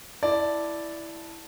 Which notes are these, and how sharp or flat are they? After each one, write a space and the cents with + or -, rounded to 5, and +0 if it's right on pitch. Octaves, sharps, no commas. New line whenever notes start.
E4 +0 D5 +0 A5 +0